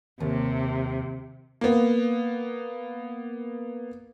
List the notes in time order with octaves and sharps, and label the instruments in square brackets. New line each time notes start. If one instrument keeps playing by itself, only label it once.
[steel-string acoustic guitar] D#2 [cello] C3
[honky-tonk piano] A#3 B3